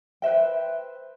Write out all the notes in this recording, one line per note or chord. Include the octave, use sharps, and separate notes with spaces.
B4 C5 E5 G5